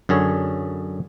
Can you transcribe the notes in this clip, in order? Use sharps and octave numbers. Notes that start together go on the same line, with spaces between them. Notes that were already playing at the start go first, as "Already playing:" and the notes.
F#2 D3 G#4 C#5